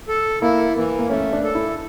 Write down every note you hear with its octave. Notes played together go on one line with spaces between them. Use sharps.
A4
A#3 E4
E3 A#3
A#3
A3 C#4
D4
A4
E4